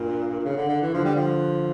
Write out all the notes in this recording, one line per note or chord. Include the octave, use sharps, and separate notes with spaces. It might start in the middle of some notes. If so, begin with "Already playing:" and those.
Already playing: G2 A#2
A#2
C#3
D3
D3
E3
D3 F3
G3
F3